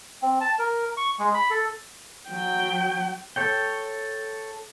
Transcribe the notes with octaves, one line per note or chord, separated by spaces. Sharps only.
C4
A5
A#4
C#6
G#3
B5
A4
F#3 G5
A4 C#5 G5